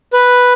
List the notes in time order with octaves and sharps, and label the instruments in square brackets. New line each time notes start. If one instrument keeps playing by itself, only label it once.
[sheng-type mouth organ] B4